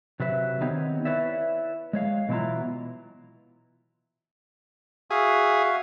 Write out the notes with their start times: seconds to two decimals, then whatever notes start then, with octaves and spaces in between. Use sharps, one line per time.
0.20 C3 F#3 B4 E5
0.61 D#3 B3 C4 D#4 G4 C#5
1.05 E4 B4 C#5 D5 E5
1.93 G#3 C#5 F5
2.29 B2 E3 F#3 E4 F4 A#5
5.11 F#4 G#4 E5 F5